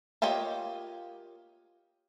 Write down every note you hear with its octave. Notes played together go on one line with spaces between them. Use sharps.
A#3 F4 G4 C#5 D#5